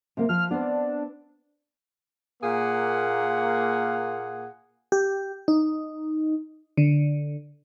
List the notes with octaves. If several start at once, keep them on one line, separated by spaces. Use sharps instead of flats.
C3 A#3
F3 F6
B3 C4 D4
A#2 A#3 G#4 F5 F#5
G4
D#4
D3